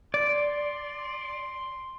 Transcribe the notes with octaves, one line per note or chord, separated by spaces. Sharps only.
D5 C6